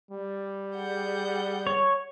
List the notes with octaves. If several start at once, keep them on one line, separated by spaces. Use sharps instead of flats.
G3
G#4 F#5 G6
C#5